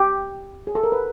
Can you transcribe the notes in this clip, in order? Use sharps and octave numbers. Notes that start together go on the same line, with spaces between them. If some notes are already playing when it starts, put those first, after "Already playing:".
Already playing: G4
G#4
A4
A#4
B4